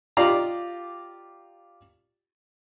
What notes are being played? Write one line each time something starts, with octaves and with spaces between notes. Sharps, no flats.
F4 G4 D5 D#5 F5 A#5